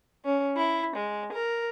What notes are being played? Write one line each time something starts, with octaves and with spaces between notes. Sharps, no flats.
C#4
E4
G#3
A#4